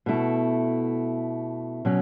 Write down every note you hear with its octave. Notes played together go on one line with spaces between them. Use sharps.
B2 A3 E4
B2 F#3 C#4